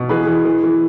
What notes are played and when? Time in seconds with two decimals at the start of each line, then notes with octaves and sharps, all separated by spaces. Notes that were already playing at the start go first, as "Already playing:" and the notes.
Already playing: B2
0.09 E3 G#4 B4
0.27 E3
0.45 E3
0.64 E3